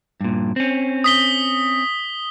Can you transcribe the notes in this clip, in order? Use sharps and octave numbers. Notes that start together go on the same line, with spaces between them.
G2 A#2
C4 C#4
D#6 B6 G7